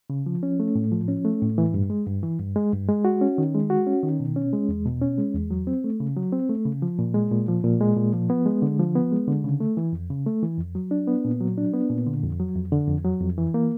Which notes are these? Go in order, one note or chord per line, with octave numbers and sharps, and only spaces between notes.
C#3
F3
C#4
A3
A2
F3
C#4
A3
A2
E3
G2
G#3
G2
E3
G2
G#3
G2
G#3
F#4
C#4
D#3
G#3
F#4
C#4
D#3
B2
C#4
G#3
E2
B2
C#4
G#3
E2
F#3
C4
A3
C#3
F#3
C4
A3
C#3
F3
A#2
G#3
A#2
F3
A#2
G#3
A#2
F3
B3
G#3
D3
F3
B3
G#3
D3
C#3
A3
E3
F2
C#3
A3
E3
F2
F#3
D4
B3
A#2
F#3
D4
B3
A#2
D3
F2
F#3
F2
D3
F2
F#3
F2
E3
A#3